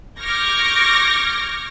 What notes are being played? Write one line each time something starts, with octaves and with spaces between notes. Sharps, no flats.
C#6 D6 F6 G6 G#6 A#6